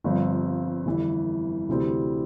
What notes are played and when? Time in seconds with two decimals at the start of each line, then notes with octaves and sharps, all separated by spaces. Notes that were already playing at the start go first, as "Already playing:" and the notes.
0.04 G1 G2 F3 C4
0.86 G1 F2 E3
1.68 D2 C3 E3 G3 C4